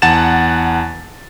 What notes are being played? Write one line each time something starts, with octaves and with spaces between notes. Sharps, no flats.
E2 F#5 A5 A6 E7